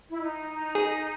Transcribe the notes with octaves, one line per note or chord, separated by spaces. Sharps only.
E4
D#4
G#4